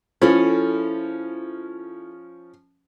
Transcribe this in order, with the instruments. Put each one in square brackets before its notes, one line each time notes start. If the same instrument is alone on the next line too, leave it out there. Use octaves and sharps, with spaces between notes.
[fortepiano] F3 C#4 [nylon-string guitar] E4 G#4 A4